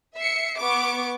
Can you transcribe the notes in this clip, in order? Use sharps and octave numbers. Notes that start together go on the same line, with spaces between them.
E5 C7 C#7
B3 C#6 D6